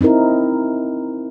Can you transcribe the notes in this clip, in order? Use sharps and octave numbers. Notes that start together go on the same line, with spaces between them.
C4 D#4 E4 A#4